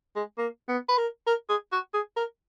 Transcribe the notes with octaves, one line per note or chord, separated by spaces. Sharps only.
G#3
A#3
B3
B4
A#4
A#4
G#4
F#4
G#4
A#4